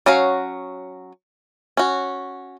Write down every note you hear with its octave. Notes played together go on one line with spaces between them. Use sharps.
F#3 C#4 F#4 C#5 F5
C#4 F#4